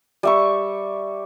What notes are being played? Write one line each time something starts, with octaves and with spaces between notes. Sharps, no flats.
G3 E5 C#6